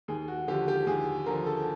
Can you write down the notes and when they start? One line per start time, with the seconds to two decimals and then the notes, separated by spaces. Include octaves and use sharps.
0.08 D#2 G#4
0.28 F#4
0.48 D3 F3 G4
0.68 G4
0.87 D#2 G#4
1.26 D3 F3 A#4
1.46 A4